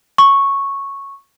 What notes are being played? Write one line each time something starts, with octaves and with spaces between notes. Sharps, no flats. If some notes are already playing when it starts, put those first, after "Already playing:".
C#6